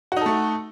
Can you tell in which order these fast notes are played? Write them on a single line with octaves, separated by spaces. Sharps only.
F#4 D#4 A4 A3